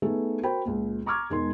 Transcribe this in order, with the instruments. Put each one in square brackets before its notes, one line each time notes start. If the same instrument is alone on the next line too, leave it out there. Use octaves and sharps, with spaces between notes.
[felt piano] A3 B3 D#4 G#4 A4
F#4 A#4 C5 G5 B5
C#2 A#2
A#5 C#6 D6 F6 G#6
E1 G#3 D#4 A#4 C6